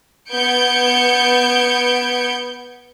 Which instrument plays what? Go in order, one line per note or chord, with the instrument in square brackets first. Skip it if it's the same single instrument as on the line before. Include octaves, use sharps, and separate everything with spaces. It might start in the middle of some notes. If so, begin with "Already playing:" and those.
[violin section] B3 G6 G#6 C#7 D7